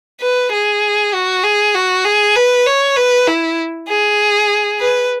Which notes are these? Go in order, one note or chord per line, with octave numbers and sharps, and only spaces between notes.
B4
G#4
F#4
G#4
F#4
G#4
B4
C#5
B4
E4
G#4
B4